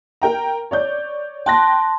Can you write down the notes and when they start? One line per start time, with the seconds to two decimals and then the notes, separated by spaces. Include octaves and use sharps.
0.22 A#4 G5 A#5
0.71 C#5 D5 G6
1.46 G5 A5 C6 F#6 A#6